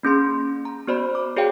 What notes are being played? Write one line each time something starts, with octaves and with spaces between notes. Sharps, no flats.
A#3 C#4 G#4 C6
A#5
B3 F#4 C5 D5 B5
D6
F#4 G#4 C#5 D5 F5 G5